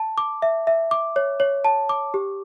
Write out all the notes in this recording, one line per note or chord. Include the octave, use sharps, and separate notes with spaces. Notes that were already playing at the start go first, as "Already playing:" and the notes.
Already playing: A5
D6
E5
E5
D6
C#5
C#5
A5
D6
G4